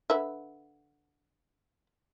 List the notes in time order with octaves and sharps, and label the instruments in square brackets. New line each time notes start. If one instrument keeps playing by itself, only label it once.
[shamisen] D3 B4 E5